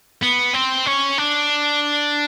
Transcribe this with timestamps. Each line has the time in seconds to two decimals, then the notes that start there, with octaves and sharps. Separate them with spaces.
0.23 B3
0.54 C4
0.86 C#4
1.18 D4